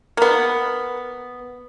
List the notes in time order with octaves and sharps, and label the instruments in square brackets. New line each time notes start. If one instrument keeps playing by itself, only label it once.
[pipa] A#3 B3